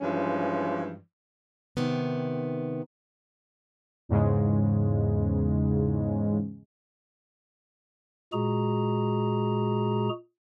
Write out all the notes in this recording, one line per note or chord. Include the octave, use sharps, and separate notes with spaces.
G2 E3 F3 G#3 C#4
C3 D#3 B3
E2 G#2 C#3 G#3
A#2 G#3 F#4 G#4 A#5